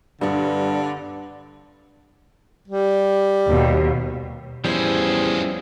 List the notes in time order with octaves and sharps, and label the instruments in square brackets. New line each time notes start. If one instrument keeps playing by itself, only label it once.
[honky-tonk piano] G2 [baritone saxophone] D3 [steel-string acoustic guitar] B3 D4
[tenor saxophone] G3
[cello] D#2 B2
[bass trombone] E2 [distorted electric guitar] F3 G#4 [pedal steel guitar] G3 C#4 E4 [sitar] C5